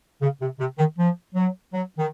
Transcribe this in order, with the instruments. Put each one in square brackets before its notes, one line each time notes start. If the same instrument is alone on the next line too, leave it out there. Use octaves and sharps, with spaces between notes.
[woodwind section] C#3
C3
C3
D#3
F3
F#3
F#3
D#3